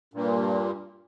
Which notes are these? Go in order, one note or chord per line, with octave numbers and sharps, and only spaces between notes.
G2 A#2